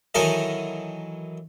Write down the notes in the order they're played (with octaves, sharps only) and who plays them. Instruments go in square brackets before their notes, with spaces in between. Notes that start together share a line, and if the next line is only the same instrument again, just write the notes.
[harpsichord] D#3 E3 F#3 A4 A#4 D#5